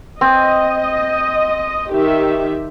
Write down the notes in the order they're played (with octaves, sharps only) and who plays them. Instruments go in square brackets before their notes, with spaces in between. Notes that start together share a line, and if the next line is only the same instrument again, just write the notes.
[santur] C4 [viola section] D#5
[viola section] D#3 G4 E5